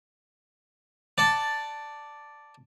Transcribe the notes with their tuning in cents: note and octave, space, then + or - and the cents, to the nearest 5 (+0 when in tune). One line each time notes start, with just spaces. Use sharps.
D5 +0 F#5 +25 A5 +5